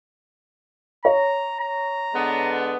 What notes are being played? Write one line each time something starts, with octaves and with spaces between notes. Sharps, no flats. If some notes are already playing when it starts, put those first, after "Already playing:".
C#5 A#5
A#5
D3 G#3 B3